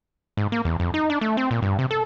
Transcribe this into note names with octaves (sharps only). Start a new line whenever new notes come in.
G#2
A#3
E2
F2
D#4
D4
A3
C4
A#2
G2
C3
A4